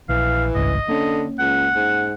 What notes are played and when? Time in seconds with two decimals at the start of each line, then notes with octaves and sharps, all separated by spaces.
0.09 A#1 E3 F5
0.55 G#1 C#2 G2 D#5
0.88 D3 A#3 C#4
1.39 C#2 F#5
1.75 G#2